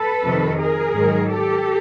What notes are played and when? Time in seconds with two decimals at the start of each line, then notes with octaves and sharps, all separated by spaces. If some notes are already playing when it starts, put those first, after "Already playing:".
Already playing: A4 B4
0.24 F2 C3 D#3
0.59 G#4 A#4
0.94 G#2 D#3 F#3
1.29 G4 A4